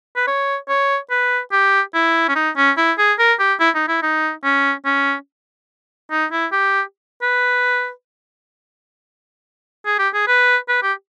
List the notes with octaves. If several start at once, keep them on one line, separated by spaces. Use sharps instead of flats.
B4
C#5
C#5
B4
G4
E4
C#4
D#4
C#4
E4
G#4
A#4
G4
E4
D#4
E4
D#4
C#4
C#4
D#4
E4
G4
B4
G#4
G4
G#4
B4
B4
G4